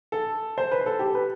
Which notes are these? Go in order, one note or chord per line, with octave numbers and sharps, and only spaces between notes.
A4
C5
B4
A4
G4
B4